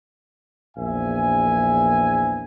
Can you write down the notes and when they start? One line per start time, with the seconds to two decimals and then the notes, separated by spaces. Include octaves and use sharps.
0.78 A#1 E2 E5 G#5